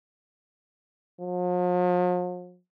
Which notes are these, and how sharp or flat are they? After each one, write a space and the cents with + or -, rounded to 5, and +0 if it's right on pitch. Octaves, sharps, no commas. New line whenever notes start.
F3 +45